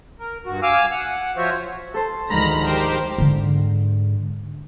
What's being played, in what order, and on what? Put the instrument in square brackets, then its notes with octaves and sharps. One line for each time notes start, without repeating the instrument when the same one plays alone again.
[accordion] A#4
G2 F#4
F5 G#5 D6 E6 F6
F#5
F3 F4 F#4 C5 C#5 E5
[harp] A4 C5 A5
[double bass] D2 D#3 [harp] G#2 F3 [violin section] A#5 B5 A#6
[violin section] G4 A#4 C5
[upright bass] G#2 D3